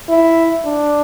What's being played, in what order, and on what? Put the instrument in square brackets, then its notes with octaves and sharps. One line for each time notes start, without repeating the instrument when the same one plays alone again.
[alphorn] E4
D4